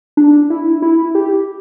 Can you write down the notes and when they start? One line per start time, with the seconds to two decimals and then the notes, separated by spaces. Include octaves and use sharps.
0.17 D4
0.50 E4
0.82 E4
1.15 G4